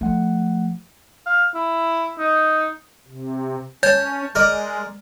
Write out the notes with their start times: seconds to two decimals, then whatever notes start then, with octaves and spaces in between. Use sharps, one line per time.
0.01 F3 A3 F#5
1.26 F5
1.55 E4
2.18 D#4
3.07 C3
3.83 C#4 C#5 A5 G6
4.35 G#3 A#4 D5 D#5